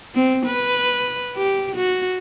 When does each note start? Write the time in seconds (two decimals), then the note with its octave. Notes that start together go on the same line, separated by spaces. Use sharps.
0.15 C4
0.46 B4
1.36 G4
1.76 F#4